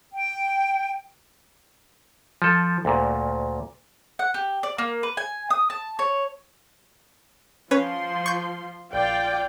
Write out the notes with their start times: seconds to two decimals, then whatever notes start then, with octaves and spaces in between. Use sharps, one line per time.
0.14 G5
2.42 F3 A4
2.85 D2 A#2
4.19 F#5
4.34 G4
4.63 D5
4.78 A#3
5.03 B4
5.17 G#5
5.50 D#6
5.70 A5
5.99 C#5
7.71 F3 C#4 B4 C#5 C6
8.26 C#6 G6
8.93 A#1 F4 D5 G5